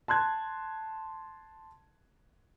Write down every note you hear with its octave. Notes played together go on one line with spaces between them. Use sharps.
A5 C6 F#6 G#6